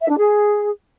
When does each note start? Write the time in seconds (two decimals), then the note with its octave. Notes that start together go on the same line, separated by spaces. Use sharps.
0.01 E5
0.09 D4
0.18 G#4